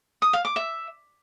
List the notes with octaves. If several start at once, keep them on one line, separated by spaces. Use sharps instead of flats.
D#6
F5
D6
E5